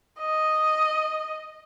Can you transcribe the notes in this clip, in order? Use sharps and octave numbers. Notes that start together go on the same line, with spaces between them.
D#5